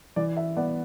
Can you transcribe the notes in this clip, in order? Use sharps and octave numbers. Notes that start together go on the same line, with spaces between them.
E3 D5
E5
B3 D5 F#5